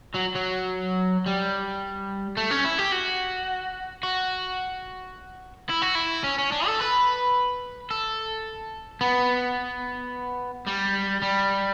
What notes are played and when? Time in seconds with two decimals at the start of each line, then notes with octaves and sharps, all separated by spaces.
0.15 F#3
0.36 F#3
1.26 G3
2.37 A3
2.51 C#4
2.65 E4
2.79 G4
2.92 F#4
4.03 F#4
5.69 E4
5.82 F#4
5.95 E4
6.24 C#4
6.38 C#4
6.52 D4
6.66 A4
6.80 B4
7.91 A4
9.01 B3
10.67 G3
11.22 G3